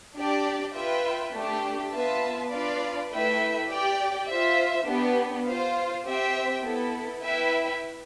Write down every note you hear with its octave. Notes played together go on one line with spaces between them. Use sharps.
D4 G4 D5
F4 B4 E5 G5
A3 D4 G4
B3 F4 B4 E5 A5
D4 F4 B4 D5 F5
A3 E4 B4 E5 G5
G4 D5 G5
F4 C5 E5
B3 D4 G4
F4 C5 F5
C4 G4 C5 E5 G5
B3 E4 A4
E4 B4 E5 G5